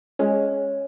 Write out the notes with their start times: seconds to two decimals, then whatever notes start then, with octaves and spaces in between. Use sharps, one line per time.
0.19 G#3 C#4